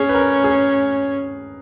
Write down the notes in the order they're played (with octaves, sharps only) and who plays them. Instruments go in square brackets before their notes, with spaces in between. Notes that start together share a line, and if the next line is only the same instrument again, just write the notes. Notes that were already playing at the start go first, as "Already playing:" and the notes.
Already playing: [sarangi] C#4 [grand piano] G#4
[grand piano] B4
A#4
G#4